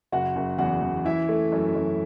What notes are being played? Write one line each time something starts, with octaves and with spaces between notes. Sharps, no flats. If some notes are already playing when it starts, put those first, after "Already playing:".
F#1 F#4 F#5
F#1
E2 F#4 F#5
E2
E3 E4 E5
A3
F#2
F#2